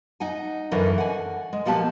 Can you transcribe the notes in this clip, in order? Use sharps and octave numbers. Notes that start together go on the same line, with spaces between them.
D#4 F#5 G#5
F#2 D3 E3 A#4 C#5 D#5
F#5 G#5
G#3
A#2 F3 A#3 B3 G4 A5